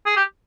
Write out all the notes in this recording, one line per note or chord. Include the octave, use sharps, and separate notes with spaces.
G#4
G4